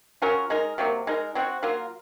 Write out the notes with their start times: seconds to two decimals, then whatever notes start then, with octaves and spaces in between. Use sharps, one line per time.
0.22 F#3 C#4 F4 A#4
0.50 G#3 D#4 A#4
0.78 C3 F#3 A#3
1.07 G#3 D#4 A#4
1.35 F#3 C4 F#4
1.63 F#3 A#3 F4 A#4